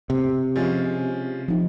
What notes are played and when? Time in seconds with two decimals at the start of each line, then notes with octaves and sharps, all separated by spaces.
0.10 C3
0.56 F3 G#3 C#4
1.48 F3 D#4